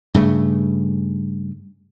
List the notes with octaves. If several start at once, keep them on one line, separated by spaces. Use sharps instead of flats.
G2 C#3 A3